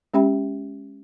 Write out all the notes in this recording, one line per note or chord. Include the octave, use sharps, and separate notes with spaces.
G#3 C#4 G4 E5 G5 B5